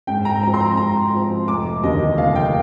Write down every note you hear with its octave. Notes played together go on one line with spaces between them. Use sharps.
G#2 G5
A#5
F3 C4 A#5
C6
A#5
G#2 A#5
F3 C4
F1 D6
D#2 D3 G3 D#5
F1 F5
G5